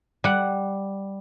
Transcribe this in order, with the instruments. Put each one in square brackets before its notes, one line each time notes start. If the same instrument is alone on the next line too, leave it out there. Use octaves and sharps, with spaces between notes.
[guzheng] G3 F#5